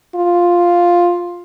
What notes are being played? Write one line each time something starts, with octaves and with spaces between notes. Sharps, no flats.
F4